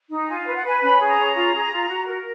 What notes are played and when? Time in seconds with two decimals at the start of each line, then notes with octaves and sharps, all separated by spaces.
0.10 D#4
0.28 F4 G#5
0.42 F#5
0.46 B4
0.55 F#5
0.64 B4 G#5
0.82 C#4 B5
0.99 G#4
1.09 A#5
1.17 C#4
1.35 F4
1.53 G#4
1.71 F4
1.89 F#4
2.07 A#4